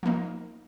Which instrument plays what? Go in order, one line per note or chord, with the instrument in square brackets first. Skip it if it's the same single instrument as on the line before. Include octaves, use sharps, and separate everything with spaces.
[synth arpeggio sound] F3 A#3 D#4